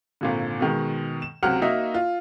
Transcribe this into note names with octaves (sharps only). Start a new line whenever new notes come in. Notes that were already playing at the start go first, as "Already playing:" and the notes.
G#1 A#2 D3
B2 D#3 G#3
E7
C#2 C3 F#3 F#5 F6
A#3 D#4 F#4 D#5 E5
F4